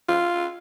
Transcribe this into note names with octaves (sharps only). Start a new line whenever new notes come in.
F4